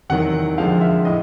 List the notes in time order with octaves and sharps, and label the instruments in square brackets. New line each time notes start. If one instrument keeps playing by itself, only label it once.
[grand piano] E2 C3 D#3 F#3 F#5
F2 D3 F3 G#3 C4 F5
E5
A2 D#5